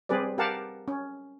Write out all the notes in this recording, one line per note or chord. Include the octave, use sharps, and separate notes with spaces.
G3 C4 G4 G#4 B4 D5
G4 A#4 F5 F#5 A5
C#4